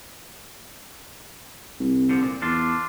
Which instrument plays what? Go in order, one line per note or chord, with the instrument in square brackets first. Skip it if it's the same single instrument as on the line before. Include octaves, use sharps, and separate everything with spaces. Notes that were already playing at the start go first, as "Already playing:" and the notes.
[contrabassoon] C2
[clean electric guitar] D3 F3
A#2
[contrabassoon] E2 [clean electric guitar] D4 F4